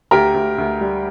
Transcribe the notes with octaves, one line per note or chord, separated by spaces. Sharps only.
D2 G4 A#4
D2
D2
G3